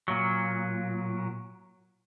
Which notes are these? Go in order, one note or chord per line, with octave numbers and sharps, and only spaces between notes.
A#2 F#3